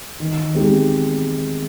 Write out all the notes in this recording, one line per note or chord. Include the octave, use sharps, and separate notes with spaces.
D#3
G#3 C4 D#4 G4